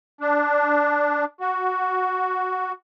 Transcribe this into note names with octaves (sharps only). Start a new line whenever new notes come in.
D4
F#4